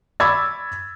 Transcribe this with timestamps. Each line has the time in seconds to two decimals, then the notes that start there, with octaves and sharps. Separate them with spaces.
0.20 B5 C#6 D6 E6 G#6 A6